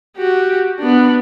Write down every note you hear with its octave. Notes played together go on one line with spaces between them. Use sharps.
F#4 G4
B3 D4